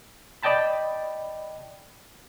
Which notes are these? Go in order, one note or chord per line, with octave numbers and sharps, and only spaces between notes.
D5 D#5 G5 A5 B5